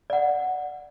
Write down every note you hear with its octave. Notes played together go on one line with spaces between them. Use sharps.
D5 F#5